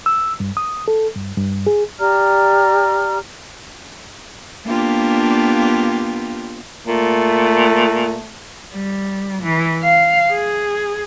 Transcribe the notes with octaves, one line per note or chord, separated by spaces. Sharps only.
E6
G2
D#6
A4
G2
G2
G#4
G4 D5 A#5 F6
A#3 B3 D4 F4 G4
A#2 A3
G3
E3
F5
G#4